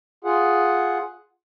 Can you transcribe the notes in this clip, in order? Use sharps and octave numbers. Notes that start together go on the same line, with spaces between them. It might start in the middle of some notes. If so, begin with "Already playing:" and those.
F4 G#4 F#5